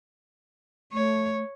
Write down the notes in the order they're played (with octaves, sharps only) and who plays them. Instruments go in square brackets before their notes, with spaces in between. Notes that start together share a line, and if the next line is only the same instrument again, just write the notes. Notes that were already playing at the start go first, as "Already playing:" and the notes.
[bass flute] A3 [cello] C#5